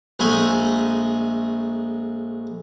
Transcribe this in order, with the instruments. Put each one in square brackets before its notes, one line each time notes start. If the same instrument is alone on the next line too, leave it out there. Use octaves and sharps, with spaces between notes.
[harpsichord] A#1 G#3 A3 G#5